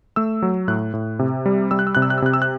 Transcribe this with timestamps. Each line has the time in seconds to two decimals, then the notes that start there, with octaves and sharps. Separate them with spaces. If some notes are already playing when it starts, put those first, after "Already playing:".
0.16 A3 E6
0.42 F#3
0.68 A2 F#6
0.94 A2
1.19 C3
1.46 G3
1.71 G3 E6
1.79 F#6
1.87 E6
1.95 C3 F#6
2.02 E6
2.10 F#6
2.18 E6
2.22 C3 F#6
2.33 E6
2.42 F#6